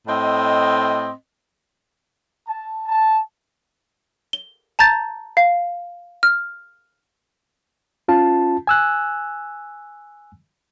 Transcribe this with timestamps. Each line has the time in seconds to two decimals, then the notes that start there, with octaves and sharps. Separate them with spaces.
0.07 A2 C4 D#5
2.46 A5
2.86 A5
4.33 G7
4.79 A5 A#5 G6 A6
5.37 F5
6.23 F6
8.08 C#4 F4 A5
8.67 G#5 E6 F#6